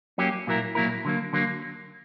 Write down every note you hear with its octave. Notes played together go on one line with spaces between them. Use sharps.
F#3 A#3 C#4 G4
A#2 F#3 A#3 E4 A#4
A#2 F#3 A#3 E4 A#4
D3 F#3 A#3
D3 F#3 A#3